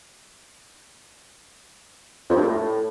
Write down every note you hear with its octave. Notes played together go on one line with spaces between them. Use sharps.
F2
G2
A#2
A2